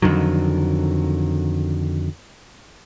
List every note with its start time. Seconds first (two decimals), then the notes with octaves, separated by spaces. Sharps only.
0.02 F2 D3 D#3 F#3